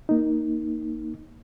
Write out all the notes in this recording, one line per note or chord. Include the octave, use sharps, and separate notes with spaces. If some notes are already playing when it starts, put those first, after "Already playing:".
A#3 D#4